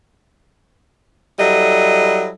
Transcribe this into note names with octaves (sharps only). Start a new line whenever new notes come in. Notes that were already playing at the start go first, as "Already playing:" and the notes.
F#3 G3 E4 A4 D#5